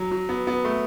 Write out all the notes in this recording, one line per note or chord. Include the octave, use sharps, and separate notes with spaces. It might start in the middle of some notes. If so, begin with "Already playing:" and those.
Already playing: F#3
F#3
B3
B3
A3